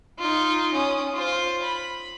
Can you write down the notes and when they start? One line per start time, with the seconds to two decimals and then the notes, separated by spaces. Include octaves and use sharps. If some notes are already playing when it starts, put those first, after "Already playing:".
0.19 D#4 F4
0.73 C#4 D#6
1.13 F4 C5
1.62 B5